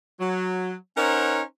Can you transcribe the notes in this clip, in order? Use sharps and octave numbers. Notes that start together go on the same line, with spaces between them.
F#3
C#4 D#4 A#4 C5 C#5 F#5